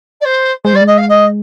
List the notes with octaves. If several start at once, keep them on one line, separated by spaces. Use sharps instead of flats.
D5
C5
G#3 C5
G3 D5
G#3
D#5
F5
D#5